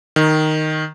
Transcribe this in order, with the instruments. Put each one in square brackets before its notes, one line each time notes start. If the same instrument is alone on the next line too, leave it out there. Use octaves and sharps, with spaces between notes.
[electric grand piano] D#3